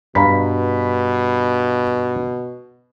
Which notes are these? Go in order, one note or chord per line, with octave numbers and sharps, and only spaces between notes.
G2 B2 F5 A#5 B5 B6